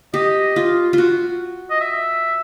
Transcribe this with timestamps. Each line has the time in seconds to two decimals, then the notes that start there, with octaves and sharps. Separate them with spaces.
0.14 G4 D#5
0.56 F4
0.93 F4 F#4
1.70 D#5
1.81 E5